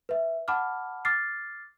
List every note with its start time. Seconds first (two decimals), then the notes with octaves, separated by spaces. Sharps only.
0.09 B4 E5
0.48 F#5 A5 B5 D6 F6
1.05 D6 F6 A6 C7